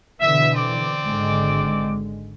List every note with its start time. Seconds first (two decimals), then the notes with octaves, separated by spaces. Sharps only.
0.20 B2 D3 E3 E5
0.55 C4 D5 D6
1.06 G#1 D3 G#3